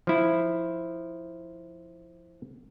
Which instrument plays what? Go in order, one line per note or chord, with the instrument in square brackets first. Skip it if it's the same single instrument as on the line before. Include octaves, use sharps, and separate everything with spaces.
[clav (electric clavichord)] F3 E4